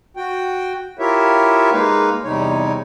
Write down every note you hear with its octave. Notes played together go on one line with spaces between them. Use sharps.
F#4 G5
E4 F4 G4 A#4 C#5 E5
G#3 A#3 D#4 B4 F5
E2 C3 G3 D#4 C#5